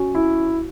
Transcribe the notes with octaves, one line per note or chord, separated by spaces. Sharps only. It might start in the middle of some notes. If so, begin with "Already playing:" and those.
Already playing: C#4 F#4
E4